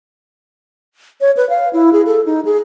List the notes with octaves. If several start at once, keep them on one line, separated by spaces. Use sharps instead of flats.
C#5
B4
F5
E4
G#4
A4
D#4
G#4